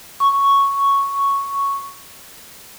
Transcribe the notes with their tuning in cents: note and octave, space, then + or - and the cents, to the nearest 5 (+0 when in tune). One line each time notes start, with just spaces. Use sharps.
C#6 +0